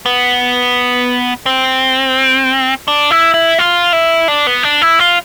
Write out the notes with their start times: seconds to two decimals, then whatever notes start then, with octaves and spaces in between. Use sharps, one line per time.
0.06 B3
1.46 C4
2.88 D4
3.11 E4
3.34 E4
3.58 F4
3.93 E4
4.28 D4
4.47 B3
4.63 D4
4.82 E4
4.99 F4